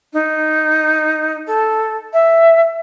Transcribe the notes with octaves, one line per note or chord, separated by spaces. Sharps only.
D#4
A4
E5